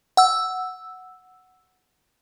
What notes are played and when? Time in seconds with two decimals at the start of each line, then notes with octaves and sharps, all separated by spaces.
0.17 F#5 E6